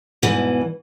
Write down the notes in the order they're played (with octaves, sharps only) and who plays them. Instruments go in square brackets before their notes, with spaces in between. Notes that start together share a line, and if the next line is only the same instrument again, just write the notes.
[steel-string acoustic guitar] E2 G#2 B2 E3